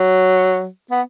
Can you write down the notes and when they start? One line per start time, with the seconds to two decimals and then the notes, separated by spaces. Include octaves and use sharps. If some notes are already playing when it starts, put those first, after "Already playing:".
Already playing: F#3
0.91 B3